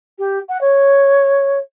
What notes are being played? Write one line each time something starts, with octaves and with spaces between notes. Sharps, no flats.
G4
F#5
C#5